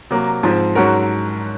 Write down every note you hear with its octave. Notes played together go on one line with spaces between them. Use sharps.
C3 F#3 A#3
G#2 F3 C4
G#2 F#3 C#4 F#4 A#4